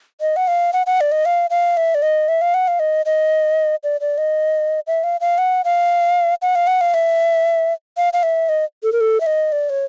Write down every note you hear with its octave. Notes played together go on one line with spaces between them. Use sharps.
D#5
F#5
F5
F#5
F#5
D5
D#5
F5
F5
E5
D5
D#5
E5
F5
F#5
F5
D#5
D#5
D5
D5
D#5
E5
F5
F5
F#5
F5
F#5
F5
F#5
F5
E5
F5
F5
E5
D#5
A4
A#4
A4
E5
D#5
D5
C#5